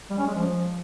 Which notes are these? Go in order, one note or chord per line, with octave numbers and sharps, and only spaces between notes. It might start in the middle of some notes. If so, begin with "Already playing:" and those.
G3
C#4
G#3
F3